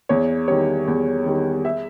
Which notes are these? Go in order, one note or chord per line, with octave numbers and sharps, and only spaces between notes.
E2 C#5
D#3 G3 C#5
E2
D#3 G3
E5